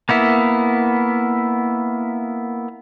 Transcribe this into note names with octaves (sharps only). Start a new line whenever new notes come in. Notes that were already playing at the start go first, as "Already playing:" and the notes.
A#3 B3 E4